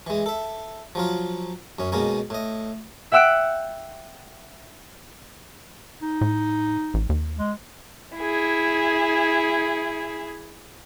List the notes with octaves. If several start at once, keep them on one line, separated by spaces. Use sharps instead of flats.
E3 G#3
A4 E5
F3 F#3 F4
F#2 C#4
B2 G#3 A#3 C#4
A2 D#5
E5 F#5 G5 E6 F#6 D7
D#4
A2
A1
D#2
G#3
E4 G#4